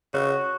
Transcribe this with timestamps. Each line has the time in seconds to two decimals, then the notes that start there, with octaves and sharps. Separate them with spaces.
0.14 C#3 F#4